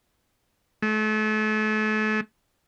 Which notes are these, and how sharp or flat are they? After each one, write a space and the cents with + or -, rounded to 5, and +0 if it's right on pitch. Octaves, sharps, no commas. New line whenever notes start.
A3 -35